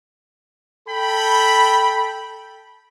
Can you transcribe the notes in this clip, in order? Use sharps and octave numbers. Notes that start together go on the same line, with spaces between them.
A4 G5 B5